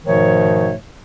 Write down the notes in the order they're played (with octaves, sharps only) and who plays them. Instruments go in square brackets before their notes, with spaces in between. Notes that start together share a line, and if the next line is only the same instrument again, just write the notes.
[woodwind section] G#2 B2 D#3 F3 A3 C#5